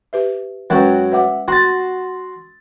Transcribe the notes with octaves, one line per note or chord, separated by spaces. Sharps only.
G4 B4 E5
F#2 F#3 G#3 C#4 B4 G5 C#6
B4 E5 F#5 D6
F#4 C6 A6